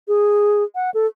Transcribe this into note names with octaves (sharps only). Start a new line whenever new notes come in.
G#4
F#5
A4